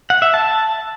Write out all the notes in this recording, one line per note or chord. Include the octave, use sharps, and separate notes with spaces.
F#5
E5
A5